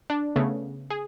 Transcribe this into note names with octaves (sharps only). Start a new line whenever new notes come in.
D4
C#3 A3 B3
G#4